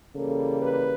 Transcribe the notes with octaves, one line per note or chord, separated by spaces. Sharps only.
C#3 E3 G3 A#3 A4
B4